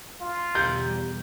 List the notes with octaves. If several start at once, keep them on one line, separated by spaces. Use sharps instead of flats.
F4
E2 B2 G3 G4 A#5 G6